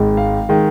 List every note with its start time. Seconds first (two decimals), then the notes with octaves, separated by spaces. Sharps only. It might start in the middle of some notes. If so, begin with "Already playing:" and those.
Already playing: G#1 G#2 G#3
0.17 F5
0.49 D#3 G#3